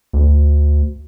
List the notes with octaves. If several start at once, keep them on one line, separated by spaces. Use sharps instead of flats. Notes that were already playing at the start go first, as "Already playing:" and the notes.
D2